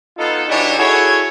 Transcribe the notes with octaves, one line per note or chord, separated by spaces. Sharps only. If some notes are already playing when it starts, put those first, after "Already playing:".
B3 D#4 F4 A4
E3 D4 D#4 F#4 G4 C#5
E4 F#4 G#4 A4 C#5